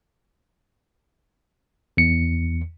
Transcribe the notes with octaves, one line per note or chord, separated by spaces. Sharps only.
E2 C#7